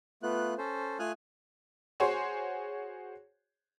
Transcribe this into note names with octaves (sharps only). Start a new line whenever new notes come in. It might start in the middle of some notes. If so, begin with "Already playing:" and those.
A3 B3 F4 F#6
C#4 A4 C5
A3 F4 G#5 D#6 F6 F#6
F#4 G#4 C5 C#5